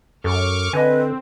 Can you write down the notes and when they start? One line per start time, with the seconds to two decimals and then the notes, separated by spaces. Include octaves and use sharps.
0.24 F#2 A4 C#6 D6 F6
0.73 D3 C4 B4 D#5 G#5